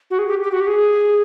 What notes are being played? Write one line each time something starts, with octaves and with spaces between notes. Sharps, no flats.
F#4
G#4
G4
G4
F#4
G4
G#4